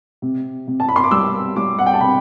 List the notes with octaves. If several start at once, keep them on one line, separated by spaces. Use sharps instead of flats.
C3
C3
A5
B5
C6
D6
G3 E6
G3 D6
F#5
G5
A5
C3 B5